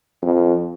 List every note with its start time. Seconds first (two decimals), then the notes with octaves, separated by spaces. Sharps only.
0.22 F2